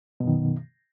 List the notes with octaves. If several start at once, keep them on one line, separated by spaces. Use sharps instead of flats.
F#2 B2 D#3